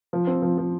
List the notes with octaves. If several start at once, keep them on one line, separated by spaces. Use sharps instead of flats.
F3
C4
F3
F3